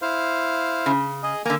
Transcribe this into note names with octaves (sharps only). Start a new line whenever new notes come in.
E4 C5 F5
C#3
G#4 D#5
D3 A#3 G#5 A#5